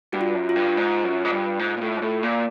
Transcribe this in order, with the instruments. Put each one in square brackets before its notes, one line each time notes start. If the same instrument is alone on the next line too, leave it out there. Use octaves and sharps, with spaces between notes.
[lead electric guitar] G2 [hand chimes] F#4
[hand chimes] F4
[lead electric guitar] F#2
[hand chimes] F4
[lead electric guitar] G2
G#2
F#2
G#2
G2
G#2
A#2
A2
G#2
A2
A#2